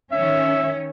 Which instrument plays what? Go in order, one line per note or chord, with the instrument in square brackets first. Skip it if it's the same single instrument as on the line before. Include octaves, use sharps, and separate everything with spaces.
[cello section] D#3 C#4 [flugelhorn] E5